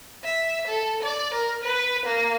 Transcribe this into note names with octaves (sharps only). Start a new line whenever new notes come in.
E5
A4
D5
A#4
B4
A#3